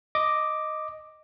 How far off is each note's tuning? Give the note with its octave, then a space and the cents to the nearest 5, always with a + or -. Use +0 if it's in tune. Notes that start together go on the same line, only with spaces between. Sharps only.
D#5 +0 D6 +5